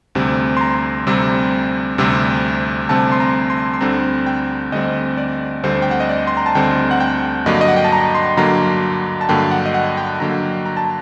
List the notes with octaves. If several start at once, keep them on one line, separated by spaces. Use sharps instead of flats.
D2 C3 G3 C4
C6
A#5
D2 C3 G3 C4
D2 C3 G3 C4
D2 C3 G3 C4 A5
C6
A#5
C6
C6
D2 D3 G3 C4 A#5
G5
D2 D3 G3 C4 D#5
D5
D2 D3 G3 C4 C5
G5
F#5
D#5
D5
C6
A#5
A5
D2 D3 G3 C4 G5
F#5
G5
G2 D3 F#3 A#3 D#5
D#5
F#5
G5
A5
A#5
C6
G2 D3 F#3 A#3 A#5
A5
G2 D3 F#3 A#3 G5
F#5
D#5
F#5
G5
G2 D3 F#3 A#3 A#5
A#5
A5